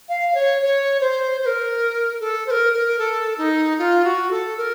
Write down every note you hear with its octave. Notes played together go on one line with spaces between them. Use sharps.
F5
C#5
C#5
C5
C5
A#4
A4
C5
A#4
A#4
A4
D#4
F4
F#4
A4
A#4